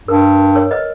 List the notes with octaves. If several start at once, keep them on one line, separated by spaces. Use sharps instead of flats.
G2 A#4
A#4 C#5
B4 D#5